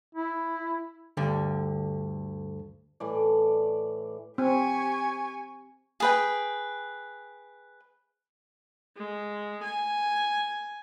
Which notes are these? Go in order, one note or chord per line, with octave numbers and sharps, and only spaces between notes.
E4
D2 G2 D3
A2 E3 D5
C4 G4 G#5 C#6
G#4 B4 G5
G#3
G#5